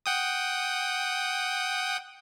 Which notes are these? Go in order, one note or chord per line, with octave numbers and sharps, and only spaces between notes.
F#5 G5 D#6